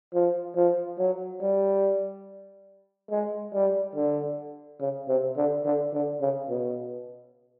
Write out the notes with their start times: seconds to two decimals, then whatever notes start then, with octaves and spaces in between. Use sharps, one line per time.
0.14 F3
0.56 F3
0.99 F#3
1.42 G3
3.11 G#3
3.54 G3
3.96 D3
4.81 C#3
5.08 C3
5.37 D3
5.65 D3
5.93 D3
6.22 C#3
6.50 B2